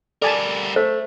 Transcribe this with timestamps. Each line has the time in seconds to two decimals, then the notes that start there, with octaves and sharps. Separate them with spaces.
0.22 G3 A4 A#4 D5 G#5 A5
0.76 A3 C5